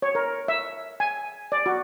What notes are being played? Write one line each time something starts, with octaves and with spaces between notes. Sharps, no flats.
C#5
A#4
E5
G#5
D5
F#4